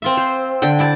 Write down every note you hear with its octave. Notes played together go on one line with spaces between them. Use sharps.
C4 F4 E5
C5
D3 G5
E4 D5 A5